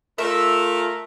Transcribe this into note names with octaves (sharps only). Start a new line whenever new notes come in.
A3 F4 A#4 E5